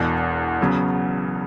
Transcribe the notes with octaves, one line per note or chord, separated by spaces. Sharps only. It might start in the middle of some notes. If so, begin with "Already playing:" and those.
Already playing: E1 E2 B2
C#3 F#3 B3